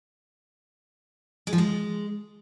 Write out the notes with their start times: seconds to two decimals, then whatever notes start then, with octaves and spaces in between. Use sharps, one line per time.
1.47 G#3
1.53 F3
1.58 G#3